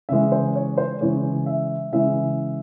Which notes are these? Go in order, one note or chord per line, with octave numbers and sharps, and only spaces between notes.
C#3 E3 G#3 E5
C5
C#5
C5
C#3 E3 G#3 C#5
E5
C#3 E3 G#3 E5